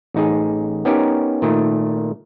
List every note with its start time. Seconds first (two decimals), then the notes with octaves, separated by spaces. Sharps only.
0.14 A1 D#4 G#4
0.85 B3 C#4 D#4 G4 A#4
1.42 A#2 D#3 A3